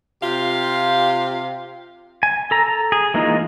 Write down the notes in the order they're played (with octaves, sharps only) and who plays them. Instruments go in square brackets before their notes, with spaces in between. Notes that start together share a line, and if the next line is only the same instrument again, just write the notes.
[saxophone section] C3 F4 G4 F5
[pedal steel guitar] G#5
A4 A#5
G#4
E3 G#3 A#3 D#4 F4